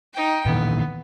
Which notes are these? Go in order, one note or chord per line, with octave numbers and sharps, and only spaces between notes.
D#4 G5
A#2 D#3 E3 B3